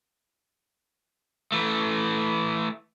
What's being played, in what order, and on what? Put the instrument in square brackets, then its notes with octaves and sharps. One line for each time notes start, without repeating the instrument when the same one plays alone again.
[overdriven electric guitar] E3 A3